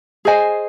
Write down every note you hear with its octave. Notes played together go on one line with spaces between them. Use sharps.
G#4 C5 D#5 G#5